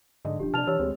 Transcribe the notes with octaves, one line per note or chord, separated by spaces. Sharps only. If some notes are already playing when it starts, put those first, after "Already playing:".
G#2 D3 D#5
D#1 F3 D4 G4
C3 D4 A5 F6 F7
E3 G4 C#5 E6
D2 G#3 C4